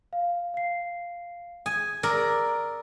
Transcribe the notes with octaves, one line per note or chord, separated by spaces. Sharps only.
F5
F5 C7
G#5 D#6
A#4 D5 A#5 D#6 E6